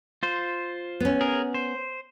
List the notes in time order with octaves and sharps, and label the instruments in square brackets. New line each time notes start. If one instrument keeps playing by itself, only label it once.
[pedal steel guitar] F4 C5
[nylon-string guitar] B3 C#4
[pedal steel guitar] G#4 A#4
C5